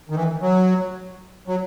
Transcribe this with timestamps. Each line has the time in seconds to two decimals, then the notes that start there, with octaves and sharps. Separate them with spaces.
0.10 D#3
0.16 E3
0.42 F#3
1.48 F#3